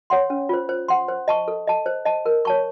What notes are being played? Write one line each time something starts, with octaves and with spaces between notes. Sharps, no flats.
C#5 F#5 C6
C#4
F4 C5
C5
F#5 C6
C5
D#5 A5 C#6
A4
D#5 A5
C5
D#5 A5
A#4
C#5 A5 C#6